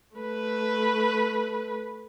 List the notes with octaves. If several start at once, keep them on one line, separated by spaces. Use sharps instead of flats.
A3 B4